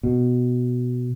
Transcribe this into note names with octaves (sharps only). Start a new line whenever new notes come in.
B2